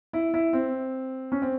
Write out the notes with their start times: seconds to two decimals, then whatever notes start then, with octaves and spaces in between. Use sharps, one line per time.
0.13 E4
0.34 E4
0.53 C4
1.32 C#4
1.42 C4